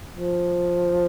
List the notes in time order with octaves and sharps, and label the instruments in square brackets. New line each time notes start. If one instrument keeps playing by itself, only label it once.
[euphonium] F3